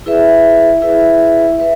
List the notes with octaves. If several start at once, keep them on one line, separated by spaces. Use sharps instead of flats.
E4 G#4 B4 E5
E4 G#4 B4 E5
B4 E5